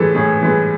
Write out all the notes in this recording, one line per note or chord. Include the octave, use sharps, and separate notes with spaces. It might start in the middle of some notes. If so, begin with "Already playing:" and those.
Already playing: A2 E3 G#3 A4
A2 G#4
E3 G#3